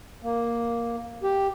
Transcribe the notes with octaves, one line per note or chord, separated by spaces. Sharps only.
A#3
G4